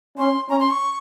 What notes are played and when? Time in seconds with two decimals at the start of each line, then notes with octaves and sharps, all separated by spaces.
0.18 C#4 C6
0.49 C#4 A#5
0.60 C6
0.70 C#6